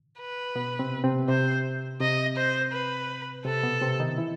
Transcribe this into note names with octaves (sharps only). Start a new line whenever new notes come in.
B4
B2 B3
C3 C4
C3 C4
C3 C4 C5
C3 C4 D#5
C5
B4
C3 C4 A4
B2 B3
C3 C4
D#3 D#4
E3 E4